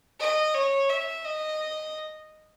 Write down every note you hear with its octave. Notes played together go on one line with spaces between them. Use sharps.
D#5
C#5
E5
D#5